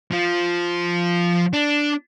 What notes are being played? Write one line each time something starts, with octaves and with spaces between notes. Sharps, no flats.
F3 F4
D4